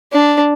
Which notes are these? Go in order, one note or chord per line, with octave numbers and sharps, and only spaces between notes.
D4